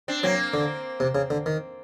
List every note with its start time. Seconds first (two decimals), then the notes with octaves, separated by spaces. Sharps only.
0.08 C4 D4
0.23 F#3 A#3 C4
0.54 D3
1.00 C3
1.15 C#3
1.30 D3
1.46 D#3